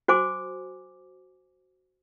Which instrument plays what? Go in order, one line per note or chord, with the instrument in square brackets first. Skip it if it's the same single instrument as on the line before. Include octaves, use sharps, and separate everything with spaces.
[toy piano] F#4 C5 G#5 D6